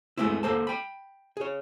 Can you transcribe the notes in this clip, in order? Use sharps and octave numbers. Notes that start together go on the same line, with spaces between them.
G#3 A3 B3 C4 E4
A#3 A4 C5 A5
G5 B5
G#4 C#5